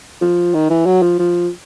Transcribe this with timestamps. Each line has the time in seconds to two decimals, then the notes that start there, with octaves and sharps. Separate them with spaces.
0.21 F3
0.54 D#3
0.70 E3
0.86 F#3
1.02 F3
1.19 F3